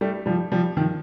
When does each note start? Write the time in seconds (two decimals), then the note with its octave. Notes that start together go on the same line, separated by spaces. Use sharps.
0.01 G3 A3
0.26 F3 G3
0.52 F3 G3
0.77 D#3 F3